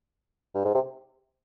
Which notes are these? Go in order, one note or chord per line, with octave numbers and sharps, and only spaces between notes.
G2
G#2
C3